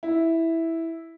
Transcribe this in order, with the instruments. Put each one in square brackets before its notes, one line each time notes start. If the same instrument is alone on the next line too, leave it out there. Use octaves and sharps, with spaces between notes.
[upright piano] E4